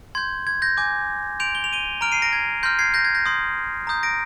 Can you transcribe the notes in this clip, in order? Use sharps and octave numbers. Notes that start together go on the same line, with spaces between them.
C6 G6 G#6
G#6
G6 A#6
G#5 D6 G6
C6 G6 D7 F7
G7
F7
D#7 G7
A#5 F6 D7 F7
C7 D#7
A#6 D7
G#6
C6 F6 G6 A#6
G#6 C7
G6 A#6
G#6
G6 A#6
C6 D#6 G6
A#5 D#6 G6
A#6 D7